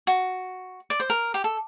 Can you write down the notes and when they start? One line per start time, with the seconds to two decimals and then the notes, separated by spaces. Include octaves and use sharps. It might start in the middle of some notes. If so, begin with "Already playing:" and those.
0.07 F#4
0.90 D5
1.00 C5
1.10 A#4
1.34 G4
1.44 A4